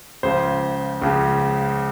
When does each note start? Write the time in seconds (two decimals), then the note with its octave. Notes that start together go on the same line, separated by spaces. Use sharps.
0.23 C#2 C#3 F3 C5
1.02 C#2 C#3 F3